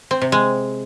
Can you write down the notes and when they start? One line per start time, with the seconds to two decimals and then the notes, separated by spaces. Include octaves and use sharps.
0.11 C4
0.22 C3
0.32 G#3